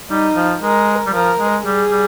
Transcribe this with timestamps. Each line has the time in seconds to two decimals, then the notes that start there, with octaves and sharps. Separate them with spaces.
0.10 G3 D#4
0.36 F3
0.62 G#3 A#4
1.06 G3
1.13 F3 A#4
1.39 G#3
1.65 G3 G#4
1.91 G3